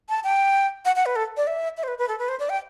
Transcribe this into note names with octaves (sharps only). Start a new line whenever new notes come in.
A5
G5
F#5
F#5
B4
A4
D5
E5
E5
C5
B4
B4
A4
B4
C5
D5
G5